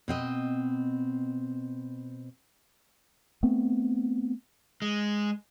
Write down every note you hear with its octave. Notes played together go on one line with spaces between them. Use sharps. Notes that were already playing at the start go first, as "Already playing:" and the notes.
B2 C4 D#5
A3 B3 C4
G#3